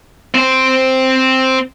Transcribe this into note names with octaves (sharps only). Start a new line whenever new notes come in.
C4 C5